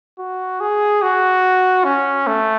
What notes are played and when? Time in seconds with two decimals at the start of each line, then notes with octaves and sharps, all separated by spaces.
0.19 F#4
0.61 G#4
1.02 F#4
1.85 C#4
2.27 A3